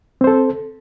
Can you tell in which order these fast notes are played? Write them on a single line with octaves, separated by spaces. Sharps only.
C4 C5 A4